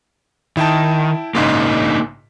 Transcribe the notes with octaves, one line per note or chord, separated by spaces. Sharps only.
D#3 E4 G5 A5
A#1 G#2 C#3 A#3 D4 D#4